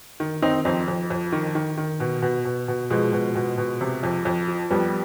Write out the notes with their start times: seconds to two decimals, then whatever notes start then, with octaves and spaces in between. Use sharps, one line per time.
0.20 D#3
0.42 D#3 C4 D#4
0.65 F2 C4 D#4
0.88 F2
1.10 F2
1.32 D#3
1.55 D#3
1.78 D#3
2.00 B2
2.22 B2
2.45 B2
2.68 B2
2.90 B2 F3 G#3
3.13 B2
3.35 B2
3.58 B2
3.81 C3
4.03 F2
4.25 F2
4.48 F3
4.71 F2 G3 B3